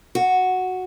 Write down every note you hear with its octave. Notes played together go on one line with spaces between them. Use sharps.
F#4